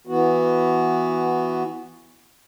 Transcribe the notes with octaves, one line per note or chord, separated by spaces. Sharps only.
E3 B3 F#4